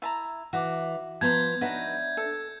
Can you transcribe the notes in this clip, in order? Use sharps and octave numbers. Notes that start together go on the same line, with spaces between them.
E4 A5 A#5
E3 F#4 D6
F3 B3 A5 A#5 C6 G6 G#6
D4 D#4 F#4 B4 C#5 E5
A4